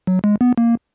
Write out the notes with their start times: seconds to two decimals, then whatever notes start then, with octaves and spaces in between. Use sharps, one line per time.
0.07 F#3
0.24 G#3
0.41 B3
0.58 A#3